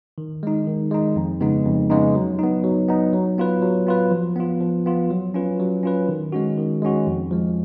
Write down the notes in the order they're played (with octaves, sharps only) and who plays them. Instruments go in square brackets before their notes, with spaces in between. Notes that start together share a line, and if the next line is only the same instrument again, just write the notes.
[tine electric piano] D#3
G#3 D#4
D#3
G#3 D#4
F2
C#3 G#3 B3 D#4
F2
C#3 G#3 B3 D#4
F#3
B3 D#4
F#3
B3 D#4
F#3
B3 F4 B4
F#3
B3 F4 B4
F3
B3 F4
F3
B3 F4
F#3
C#4 F4 B4
F#3
C#4 F4 B4
D#3
G#3 C#4 F#4
D#3
G#3 C#4 F#4
F2
F3 G#3